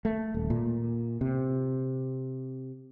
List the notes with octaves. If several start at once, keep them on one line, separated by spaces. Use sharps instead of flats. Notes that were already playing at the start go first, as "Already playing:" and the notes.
A3
D#1
A#2
C3